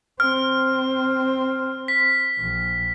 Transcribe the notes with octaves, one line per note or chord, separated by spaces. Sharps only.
C4 F6
B6
A#1